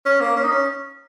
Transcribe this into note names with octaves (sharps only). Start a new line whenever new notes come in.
C#4
A#3
C#4
D#4
C#4